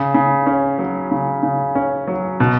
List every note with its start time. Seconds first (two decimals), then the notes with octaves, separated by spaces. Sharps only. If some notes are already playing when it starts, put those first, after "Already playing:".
Already playing: C#3
0.14 C#3
0.46 C#4
0.78 F#3
1.11 C#3
1.43 C#3
1.75 C#4
2.07 F#3
2.40 B2